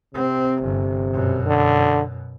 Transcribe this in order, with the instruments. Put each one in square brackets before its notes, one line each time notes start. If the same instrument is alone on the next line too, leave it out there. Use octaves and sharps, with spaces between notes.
[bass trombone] C3 [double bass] C4
[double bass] G1
F#2 B2
[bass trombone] D3